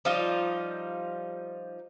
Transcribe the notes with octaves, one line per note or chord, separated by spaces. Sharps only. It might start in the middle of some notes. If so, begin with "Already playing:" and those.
F3 G3 D#4 F4